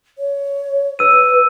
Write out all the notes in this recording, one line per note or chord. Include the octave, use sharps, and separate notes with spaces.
C#5
B4 E6 D#7